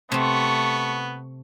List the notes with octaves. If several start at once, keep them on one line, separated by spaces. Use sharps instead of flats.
C3 A3 B3 C4 C#6